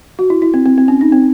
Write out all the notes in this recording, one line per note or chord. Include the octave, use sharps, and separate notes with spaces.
F#4
E4
E4
C4
C4
C4
C#4
D#4
C4